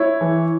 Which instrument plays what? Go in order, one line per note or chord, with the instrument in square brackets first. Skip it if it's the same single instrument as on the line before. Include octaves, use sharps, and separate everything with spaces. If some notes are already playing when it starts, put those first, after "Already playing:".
Already playing: [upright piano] E4 [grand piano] C#5
[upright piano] E3